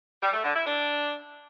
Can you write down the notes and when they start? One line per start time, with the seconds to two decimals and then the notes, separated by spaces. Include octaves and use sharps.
0.22 G3
0.33 A3
0.44 D3
0.55 E4
0.65 D4